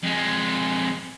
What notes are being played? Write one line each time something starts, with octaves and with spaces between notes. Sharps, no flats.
F2 G#3